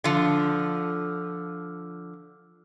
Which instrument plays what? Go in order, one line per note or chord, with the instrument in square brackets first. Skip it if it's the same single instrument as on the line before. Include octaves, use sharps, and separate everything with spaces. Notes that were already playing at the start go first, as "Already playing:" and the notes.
[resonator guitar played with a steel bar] D3 F3